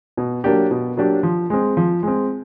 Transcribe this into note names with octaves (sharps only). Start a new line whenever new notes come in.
B2
F#3 A#3 D4 G4
B2
F#3 A#3 D4 G4
F3
G#3 C4
F3
G#3 C4